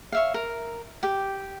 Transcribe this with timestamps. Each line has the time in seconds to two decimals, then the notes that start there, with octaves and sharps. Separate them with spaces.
0.12 C#5 E5 F5
0.34 A#4
1.03 G4 G5